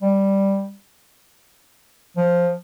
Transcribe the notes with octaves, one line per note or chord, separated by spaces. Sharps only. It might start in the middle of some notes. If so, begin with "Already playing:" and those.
G3
F3